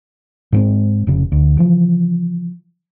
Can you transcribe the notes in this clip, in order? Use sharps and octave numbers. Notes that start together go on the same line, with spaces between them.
G#2 G#3 C4
F1 C#3
D2
C#3 E3 F3